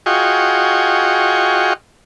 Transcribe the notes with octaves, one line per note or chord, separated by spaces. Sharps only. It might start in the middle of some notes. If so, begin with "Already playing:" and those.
F4 F#4 G#4 D#5 G5 C#6